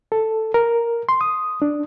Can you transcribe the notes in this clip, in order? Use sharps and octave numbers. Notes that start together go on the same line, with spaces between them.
A4
A#4
C6
D#6
D4